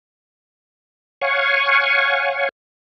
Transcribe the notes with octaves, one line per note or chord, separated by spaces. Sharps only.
C#5 F5 F#5 G#5 C#6